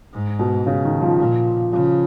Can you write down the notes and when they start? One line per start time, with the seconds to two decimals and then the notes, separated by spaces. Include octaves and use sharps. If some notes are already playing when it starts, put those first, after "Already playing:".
0.13 G#2
0.39 B2
0.66 C#3
0.85 D#3
1.02 F3
1.20 A#2 F3
1.72 C#3 F3